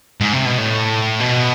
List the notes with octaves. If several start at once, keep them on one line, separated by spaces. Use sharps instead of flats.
G#2
C3
B2
A2
B2